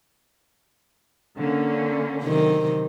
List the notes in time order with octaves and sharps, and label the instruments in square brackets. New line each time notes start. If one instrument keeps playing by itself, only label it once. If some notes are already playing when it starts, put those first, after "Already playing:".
[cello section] D3 A#3 C#4
[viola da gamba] C3 D#3 F#3